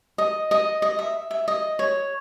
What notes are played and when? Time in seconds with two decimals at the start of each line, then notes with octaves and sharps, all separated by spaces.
0.18 D#5
0.51 D#5
0.82 D#5
0.99 E5
1.31 E5
1.48 D#5
1.79 C#5